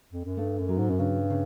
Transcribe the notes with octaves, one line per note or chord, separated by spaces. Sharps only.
F2
F#2
G2 A3
F#2
F#3
G#2
F#2
G2 C#3
C#3